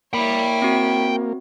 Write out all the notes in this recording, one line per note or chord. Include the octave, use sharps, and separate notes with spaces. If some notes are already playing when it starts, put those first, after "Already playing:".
A#3 E4 C#5 G5 B5
C4 F#4